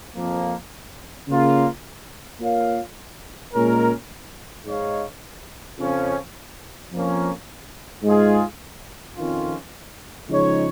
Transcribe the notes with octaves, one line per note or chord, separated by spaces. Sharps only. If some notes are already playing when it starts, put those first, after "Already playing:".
F2 F3 A#3
C#3 A#3 F4
A#3 F4 A#4 C#5 F5
A#2 G#3 C#4 A#4
G#2 G#3 D#4 C#5 F5
F2 C#3 F3 C#4
F2 F3 A#3 C#4
G#2 G#3 F4 G#4
F2 D#3 C#4 F4
C#3 F3 G#3 D#4 C#5